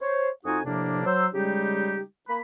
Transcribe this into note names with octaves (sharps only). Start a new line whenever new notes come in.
C5 C#5
F2 D#4 F4 F#4 G#5 D#6
A2 C3 F3 A#3 D4
F#3 C5 E6
C#3 G3 G#3 D#4 G4
A#3 B5